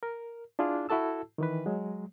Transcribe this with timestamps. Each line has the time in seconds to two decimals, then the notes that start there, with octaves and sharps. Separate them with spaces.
0.03 A#4
0.59 D4 E4 F4 G#4
0.89 E4 F#4 A4 A5 E6
1.38 D#3 E3 B4
1.66 F#3 G#3